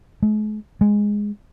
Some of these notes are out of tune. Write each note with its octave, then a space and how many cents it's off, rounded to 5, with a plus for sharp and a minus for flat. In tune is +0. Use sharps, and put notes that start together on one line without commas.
G#3 +45
G#3 -5